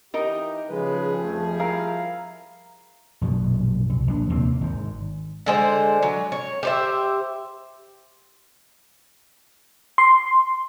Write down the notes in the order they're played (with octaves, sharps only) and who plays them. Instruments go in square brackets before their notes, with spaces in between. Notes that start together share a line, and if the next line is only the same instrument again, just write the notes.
[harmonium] E3 G4 [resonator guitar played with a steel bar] D#4 A#4 D#5
[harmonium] C#3 G#3 B4 [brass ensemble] F3 G3 G#4
[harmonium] F2 A3
[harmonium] E4 [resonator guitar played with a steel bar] A#4 [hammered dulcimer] F5 A#5
[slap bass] A#1 F#2 B2
C2
A#1 E3 D4
D#2 C3 A#3 C4
G#1 G#2
[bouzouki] D3 G#3 C5
F#3
C#5
G4 C5 E5
[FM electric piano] C6